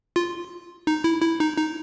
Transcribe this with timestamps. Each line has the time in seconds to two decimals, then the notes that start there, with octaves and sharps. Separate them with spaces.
0.16 F4
0.87 D#4
1.04 E4
1.22 E4
1.40 D#4
1.57 D#4